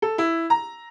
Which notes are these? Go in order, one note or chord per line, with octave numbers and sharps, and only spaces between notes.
A4
E4
A#5